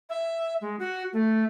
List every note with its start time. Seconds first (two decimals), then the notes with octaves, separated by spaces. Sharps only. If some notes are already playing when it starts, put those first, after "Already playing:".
0.09 E5
0.61 G#3
0.79 F#4
1.13 A3